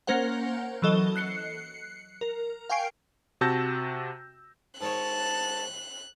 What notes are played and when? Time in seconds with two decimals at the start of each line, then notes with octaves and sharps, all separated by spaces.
0.07 A#3 C#4 A#4 C5 F#5
0.82 E3 F#3 A4 D#5 G7
1.16 F#6 C7 C#7
2.21 A#4
2.70 F5 G5 G#5 C#6 C7 D7
3.41 C3 F#4 A5 E6 G6 A#6
4.81 G#2 D#3 C#5 A5 F#6